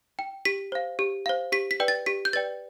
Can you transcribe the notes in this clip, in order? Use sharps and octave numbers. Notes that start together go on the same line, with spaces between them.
G5
G4 B6
C5 F5
G4
C5 F5
G4 B6
B6
B4 D5 G5
A6
G4 B6
G6
B4 D5 G5 A6